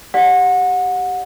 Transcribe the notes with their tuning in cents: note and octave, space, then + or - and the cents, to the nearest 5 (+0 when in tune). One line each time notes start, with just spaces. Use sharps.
G4 +0 D5 +0 F#5 -25